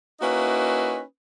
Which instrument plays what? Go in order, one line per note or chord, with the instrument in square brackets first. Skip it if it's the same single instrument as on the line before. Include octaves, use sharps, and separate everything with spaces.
[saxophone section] A#3 C#4 D#4 E4 F#4 B4